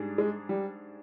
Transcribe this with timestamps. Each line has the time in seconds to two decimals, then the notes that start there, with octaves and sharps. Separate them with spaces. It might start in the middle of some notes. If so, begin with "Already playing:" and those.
Already playing: G#2 G3 D4 G#4
0.18 G#3
0.49 G3